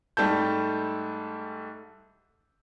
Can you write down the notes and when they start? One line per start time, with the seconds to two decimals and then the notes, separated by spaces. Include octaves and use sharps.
0.17 G#2 G3 A3 A4 A5 G6